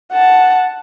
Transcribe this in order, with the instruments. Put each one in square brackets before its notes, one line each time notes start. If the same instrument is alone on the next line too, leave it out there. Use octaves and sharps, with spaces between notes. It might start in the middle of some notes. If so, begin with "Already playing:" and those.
[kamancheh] F#5 A5